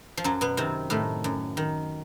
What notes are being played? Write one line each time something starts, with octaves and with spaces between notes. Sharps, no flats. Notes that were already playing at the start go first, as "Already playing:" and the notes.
F3
F#2 F#3
B2 B3
C3 D#3 C4
A2 D#3 A3
F#2
D#3